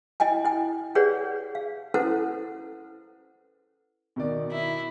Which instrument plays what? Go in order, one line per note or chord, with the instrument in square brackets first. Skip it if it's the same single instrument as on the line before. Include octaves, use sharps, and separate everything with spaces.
[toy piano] E4 D#5 G5 G#5
E4 G5
G4 G#4 B4 C#5 D5 F#5
F5
C#4 E4 A4 B4 C5 F#5
[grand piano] B2 D#3 D5
[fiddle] E4